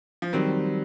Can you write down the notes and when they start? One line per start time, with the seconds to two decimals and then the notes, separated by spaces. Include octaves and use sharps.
0.22 F3
0.33 D#3 F#3 G3 C4